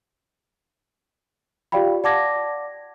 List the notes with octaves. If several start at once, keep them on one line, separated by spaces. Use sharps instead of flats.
F4 G4 D5 F5 G5 B5
D5 F#5 A5 D6 G#6 A#6